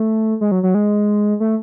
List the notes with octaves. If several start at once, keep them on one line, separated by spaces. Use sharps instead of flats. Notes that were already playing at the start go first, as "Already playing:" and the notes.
Already playing: A3
G#3
F#3
F#3
G#3
A3